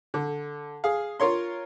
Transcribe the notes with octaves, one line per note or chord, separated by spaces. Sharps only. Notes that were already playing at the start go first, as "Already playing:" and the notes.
D3
G#4 F5
F4 A#4 C#5 C6